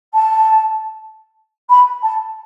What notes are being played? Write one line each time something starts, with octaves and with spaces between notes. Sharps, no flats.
A5
B5
A5